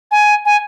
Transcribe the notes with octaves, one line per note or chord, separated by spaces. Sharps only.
G#5
G#5